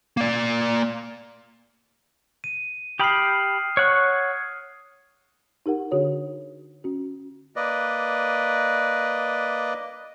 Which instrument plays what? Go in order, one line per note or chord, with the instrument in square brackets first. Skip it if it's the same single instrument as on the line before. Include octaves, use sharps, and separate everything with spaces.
[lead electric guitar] A#3 D5
[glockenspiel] D#7
[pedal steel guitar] G4 G5 B5 [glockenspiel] D#6 F6 C7
[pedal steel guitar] C#5 F#5 C#6
[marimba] D#4 G4 A#4 F#5
D3 D4 F#4 G#4 C#5
C#4 F#4
[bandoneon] A#3 B4 D5 D#5